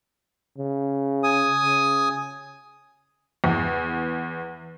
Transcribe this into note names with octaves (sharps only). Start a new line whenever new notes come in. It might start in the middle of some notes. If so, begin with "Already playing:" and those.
C#3
G#5 D#6
C#3
E2